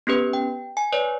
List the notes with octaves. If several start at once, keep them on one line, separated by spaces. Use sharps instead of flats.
B3 C#4 G4 B4
G5
G#5
B4 C#5 D5